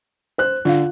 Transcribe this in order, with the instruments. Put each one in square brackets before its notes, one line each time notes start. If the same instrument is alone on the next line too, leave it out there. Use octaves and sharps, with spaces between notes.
[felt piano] C5 F#6
[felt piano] D3 [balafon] F4 F5